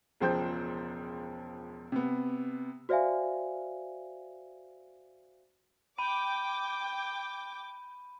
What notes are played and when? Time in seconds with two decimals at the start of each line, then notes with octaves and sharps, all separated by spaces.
0.20 E1 C#2 F3 C5 G5 G6
1.92 C3 B3
2.89 F#4 C5 D5 E5 F5 G#5
5.98 G5 B5 D6 D#7